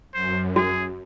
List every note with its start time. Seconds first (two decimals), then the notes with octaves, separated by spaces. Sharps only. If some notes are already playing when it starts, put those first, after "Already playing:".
0.14 F#2 C5
0.56 F#4 G#4